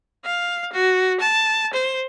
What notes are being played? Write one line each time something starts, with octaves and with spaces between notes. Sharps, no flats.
F5
F#4
A5
C5